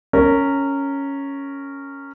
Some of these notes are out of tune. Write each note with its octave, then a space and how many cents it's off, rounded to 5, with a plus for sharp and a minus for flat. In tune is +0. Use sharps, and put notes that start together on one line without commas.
C#4 +0 A#4 -15